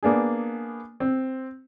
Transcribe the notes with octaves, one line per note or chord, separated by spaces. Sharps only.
A#3 B3 D4 G#4
C4